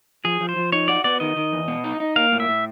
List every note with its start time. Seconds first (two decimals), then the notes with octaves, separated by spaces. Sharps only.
0.24 F3 G#4
0.41 F3
0.49 C5
0.56 F3
0.72 D#4 C#5
0.88 F#4 D5
1.04 B3 D5
1.20 D#3 D#5
1.36 D#3
1.52 E2
1.68 B2
1.84 D#4
2.00 D#4
2.16 A#3 F5
2.32 A2
2.40 E5
2.48 A2